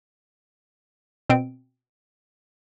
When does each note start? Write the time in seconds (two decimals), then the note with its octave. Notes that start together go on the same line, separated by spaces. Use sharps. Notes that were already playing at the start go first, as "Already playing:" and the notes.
1.30 B2 C4 D7